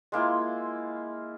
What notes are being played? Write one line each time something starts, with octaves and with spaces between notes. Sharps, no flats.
G#3 A#3 E4 F4